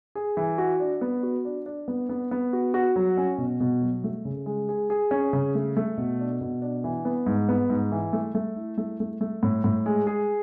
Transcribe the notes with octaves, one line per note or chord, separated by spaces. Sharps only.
G#4
E3
F#4
D4
B3
F#4
D4
D4
B3
B3
B3
F#4
F#4
F#3
C#4
B2
B2
F#3
A3
C#3
G#3
G#4
G#4
C#4
C#3
A3
A3
B2
D4
B2
D4
E3
B3
G#2
B3
G#2
E3
A3
A3
E4
A3
A3
A3
A2
A2
G#3
G#4